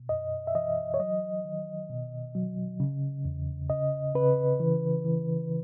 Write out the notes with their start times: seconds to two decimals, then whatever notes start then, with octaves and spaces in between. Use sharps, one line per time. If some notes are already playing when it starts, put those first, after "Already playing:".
Already playing: B2
0.09 F#2 D#5
0.47 E5
0.55 E3 D#5
0.94 C#5
1.00 F#3 D#5
1.45 D#3
1.90 B2
2.35 F#3
2.80 C#3
3.25 E2
3.70 C#3 D#5
4.15 C#3 B4
4.60 E3
5.05 E3